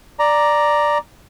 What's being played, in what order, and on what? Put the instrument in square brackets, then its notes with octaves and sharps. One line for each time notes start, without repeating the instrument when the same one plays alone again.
[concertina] D5 A#5